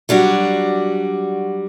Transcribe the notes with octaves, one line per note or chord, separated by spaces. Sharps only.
F#3 G3 D4 F#4